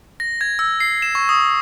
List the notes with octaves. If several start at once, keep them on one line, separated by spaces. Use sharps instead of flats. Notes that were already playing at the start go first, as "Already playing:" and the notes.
A#6
G#6
E6
C7
E7
C#6
D#6